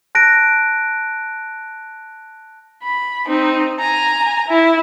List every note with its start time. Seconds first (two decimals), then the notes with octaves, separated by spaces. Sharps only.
0.15 A5 F#6 A#6 D7
2.83 B5
3.28 C4 D#4
3.80 G#5 A#5
4.48 E4